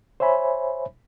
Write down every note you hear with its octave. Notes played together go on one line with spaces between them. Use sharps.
C5 C#5 E5 G#5 B5